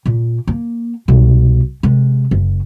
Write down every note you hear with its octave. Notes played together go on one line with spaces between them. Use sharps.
A#2
A#3
C2 B2
C3 G#3
F#1